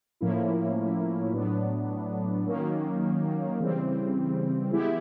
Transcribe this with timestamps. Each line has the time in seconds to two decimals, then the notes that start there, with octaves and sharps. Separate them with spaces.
0.21 A2 F3 A#3 C#4 E4
1.33 A2 F#3 B3 D4
2.46 D#3 F#3 A#3 C#4
3.59 C#3 E3 G3 C4
4.71 E3 G#3 B3 E4 G4